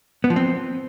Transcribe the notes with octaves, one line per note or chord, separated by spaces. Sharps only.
B3
F3
C4